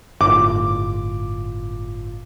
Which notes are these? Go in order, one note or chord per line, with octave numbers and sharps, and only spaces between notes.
G1 A2 F4 D6